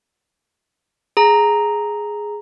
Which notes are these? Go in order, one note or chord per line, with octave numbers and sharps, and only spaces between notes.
G#4 A#5